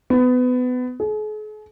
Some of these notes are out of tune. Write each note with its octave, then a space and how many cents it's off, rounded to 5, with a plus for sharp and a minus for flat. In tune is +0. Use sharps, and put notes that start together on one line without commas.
B3 +25
G#4 +45